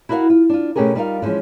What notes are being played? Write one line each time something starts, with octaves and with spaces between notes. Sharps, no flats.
E4 F#4 A#4 C5 F5 F#5
F4
D4 F4
B2 A3 C#4 G4 G#4 A#4
G3 D#4 F4 A4 A#4 F5
D3 E3 F3 G#3 C#4